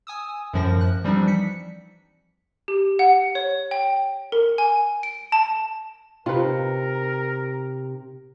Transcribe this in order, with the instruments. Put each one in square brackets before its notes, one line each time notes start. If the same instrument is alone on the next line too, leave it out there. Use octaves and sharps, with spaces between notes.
[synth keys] G#5 D#6 E6
F#2 A2 F3 A#4 A#6
F#6
E3 F3 G3 C4 D4 D#4
B6 C#7
[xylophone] G4
F#5
C#5
G5
A#4
G#5
D7
A5
[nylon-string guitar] C3 [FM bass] D#4 [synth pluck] F4 B4 [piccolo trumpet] A#4